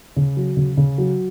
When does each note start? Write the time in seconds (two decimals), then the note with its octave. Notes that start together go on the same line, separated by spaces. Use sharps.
0.16 C#3
0.37 F#3
0.57 C#3
0.77 C#3
0.98 F#3